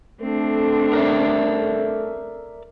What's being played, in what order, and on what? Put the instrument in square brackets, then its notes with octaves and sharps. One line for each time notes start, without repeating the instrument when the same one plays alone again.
[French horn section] A3 A4 [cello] C4 D4
[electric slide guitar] A#4 D5 E5